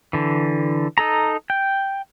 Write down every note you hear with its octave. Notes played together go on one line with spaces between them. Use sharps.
D3 E3
D#4 A4 A#5
G5